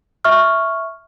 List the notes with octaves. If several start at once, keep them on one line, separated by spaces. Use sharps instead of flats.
E5 C#6 F6